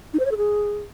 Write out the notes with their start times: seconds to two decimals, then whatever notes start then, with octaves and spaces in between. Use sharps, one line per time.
0.14 D#4
0.20 C5
0.25 C#5
0.31 A4
0.37 G#4